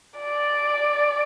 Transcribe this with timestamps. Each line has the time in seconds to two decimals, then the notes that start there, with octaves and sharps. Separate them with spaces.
0.20 D5